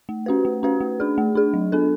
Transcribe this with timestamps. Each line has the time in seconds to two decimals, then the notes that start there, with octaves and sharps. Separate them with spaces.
0.09 A3
0.26 C#4 F#4 B4
0.45 A3
0.63 C#4 F#4 B4
0.81 A3
1.00 D4 G#4
1.18 A3
1.35 D4 G#4
1.54 F#3
1.72 B3 D4 A4